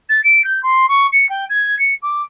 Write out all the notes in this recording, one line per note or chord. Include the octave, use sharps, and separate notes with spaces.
A6
D7
G6
C6
C#6
C#7
G5
G#6
C#7
D6